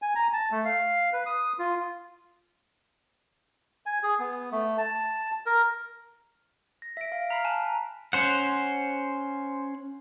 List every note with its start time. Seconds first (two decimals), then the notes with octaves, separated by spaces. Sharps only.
0.02 G#5
0.15 A#5
0.33 A5
0.52 A3
0.65 F5
1.13 B4
1.26 D#6
1.59 F4
3.86 G#5
4.03 G#4
4.19 B3
4.52 A3
4.78 A5
5.46 A#4
6.82 A#6
6.97 E5 B6 D7
7.12 F5
7.30 A#5 B5 F6 B6 C7
7.44 G#5 A5 F#6
7.64 A#5
8.13 C#4 C5 F#5